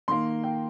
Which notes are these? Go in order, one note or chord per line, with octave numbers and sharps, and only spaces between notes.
D#3 A#3 C6
G5